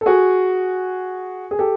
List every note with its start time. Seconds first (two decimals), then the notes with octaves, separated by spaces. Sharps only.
0.01 A4
0.06 F#4 G#4
1.51 G#4
1.59 G4 A4